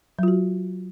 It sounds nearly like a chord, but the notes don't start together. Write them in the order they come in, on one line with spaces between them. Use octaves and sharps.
F#3 F4 F#4